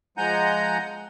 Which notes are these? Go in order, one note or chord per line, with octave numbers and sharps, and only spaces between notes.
F3 G#3 F#5 G#5 A#5 G6